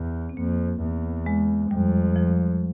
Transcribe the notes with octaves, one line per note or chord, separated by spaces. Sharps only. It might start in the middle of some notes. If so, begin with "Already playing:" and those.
Already playing: E2
C4
F2 A#3
E2
G#3
F2 G3
F3